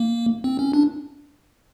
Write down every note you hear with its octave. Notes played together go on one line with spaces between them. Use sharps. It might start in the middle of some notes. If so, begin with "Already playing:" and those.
Already playing: A#3
C4
C#4
D4